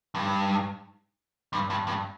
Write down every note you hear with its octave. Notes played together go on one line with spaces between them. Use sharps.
G2
G2
G2
G2